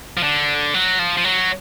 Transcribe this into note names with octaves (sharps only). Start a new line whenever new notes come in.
F3
D3
F#3
F3
F3
F#3